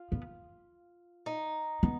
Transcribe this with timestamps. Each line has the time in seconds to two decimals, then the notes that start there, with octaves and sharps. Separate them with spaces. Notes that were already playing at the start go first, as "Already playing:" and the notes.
Already playing: F4
0.12 B3
1.26 D#4
1.83 B3